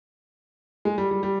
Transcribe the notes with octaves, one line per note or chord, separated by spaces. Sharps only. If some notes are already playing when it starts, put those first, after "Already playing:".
G#3
G3
G3
G3